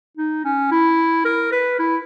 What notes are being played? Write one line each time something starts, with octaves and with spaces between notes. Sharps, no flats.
D#4
C#4
E4
A#4
B4
E4